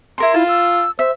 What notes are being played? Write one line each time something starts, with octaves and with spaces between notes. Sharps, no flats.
E4 A#4 C6
E4 F4 A5
E6
C5 E5